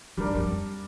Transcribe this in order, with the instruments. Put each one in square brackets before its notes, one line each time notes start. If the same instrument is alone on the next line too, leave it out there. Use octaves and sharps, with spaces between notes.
[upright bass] G2 [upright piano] G3 D4 A#4 D5
[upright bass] F2